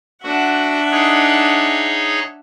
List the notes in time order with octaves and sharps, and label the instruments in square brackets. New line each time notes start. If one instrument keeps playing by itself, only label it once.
[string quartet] D4 E5 F#5 [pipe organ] F#4
[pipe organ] D#4 G#4 C#5